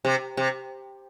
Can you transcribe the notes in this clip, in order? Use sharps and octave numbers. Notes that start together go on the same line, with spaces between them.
C3
C3